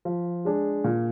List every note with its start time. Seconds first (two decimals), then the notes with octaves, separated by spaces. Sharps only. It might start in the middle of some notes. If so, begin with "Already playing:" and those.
0.05 F3
0.45 G#3 D4 G#4
0.84 A#2